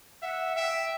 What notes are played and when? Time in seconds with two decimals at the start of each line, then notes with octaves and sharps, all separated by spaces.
0.22 E5 F#5
0.56 E5 G5